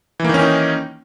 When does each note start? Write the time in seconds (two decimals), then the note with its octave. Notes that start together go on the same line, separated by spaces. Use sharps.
0.20 E3
0.24 A#3
0.29 D#3
0.34 C#4
0.39 D#4